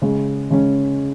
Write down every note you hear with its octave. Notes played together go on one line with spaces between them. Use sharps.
C#3 G#3 C#4
C#3 G#3 C#4